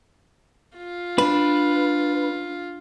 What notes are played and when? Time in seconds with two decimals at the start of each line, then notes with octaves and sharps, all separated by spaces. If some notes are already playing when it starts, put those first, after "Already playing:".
0.78 F4
1.18 D4 B4